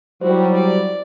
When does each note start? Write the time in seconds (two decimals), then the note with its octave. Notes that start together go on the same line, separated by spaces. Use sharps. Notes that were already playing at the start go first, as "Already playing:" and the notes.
0.21 F#3 G3 E4 F#4 C5
0.55 D5